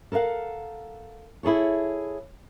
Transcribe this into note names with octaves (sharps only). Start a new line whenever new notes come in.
A4 A#4 D5 F5 F#5
E4 G#4 A4 C#5